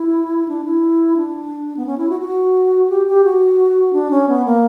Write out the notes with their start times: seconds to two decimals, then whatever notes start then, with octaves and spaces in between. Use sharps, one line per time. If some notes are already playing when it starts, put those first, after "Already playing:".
Already playing: E4
0.48 D4
0.64 E4
1.17 D4
1.77 B3
1.86 C#4
1.98 E4
2.09 F#4
2.20 F#4
2.90 G4
3.07 G4
3.24 F#4
3.93 D4
4.11 C#4
4.29 B3
4.45 A#3